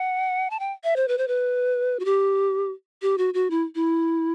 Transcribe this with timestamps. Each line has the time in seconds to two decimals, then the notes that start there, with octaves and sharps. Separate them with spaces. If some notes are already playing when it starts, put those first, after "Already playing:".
Already playing: F#5
0.50 A5
0.60 G5
0.84 E5
0.96 C5
1.08 B4
1.18 C5
1.28 B4
2.00 F#4
2.05 G4
3.02 G4
3.18 F#4
3.34 F#4
3.50 E4
3.75 E4